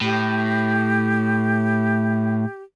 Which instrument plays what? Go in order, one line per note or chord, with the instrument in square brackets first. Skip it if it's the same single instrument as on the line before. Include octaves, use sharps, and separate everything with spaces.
[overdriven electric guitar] A2 [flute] G4